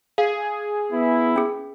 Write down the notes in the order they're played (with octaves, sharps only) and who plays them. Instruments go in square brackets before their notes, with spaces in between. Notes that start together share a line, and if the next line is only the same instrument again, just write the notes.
[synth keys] G#4 [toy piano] F5
[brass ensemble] B3 E4
[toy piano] C#4 G#4